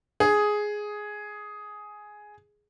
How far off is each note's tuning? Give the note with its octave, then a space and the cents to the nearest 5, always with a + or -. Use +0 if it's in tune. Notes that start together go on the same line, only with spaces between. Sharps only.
G#4 +5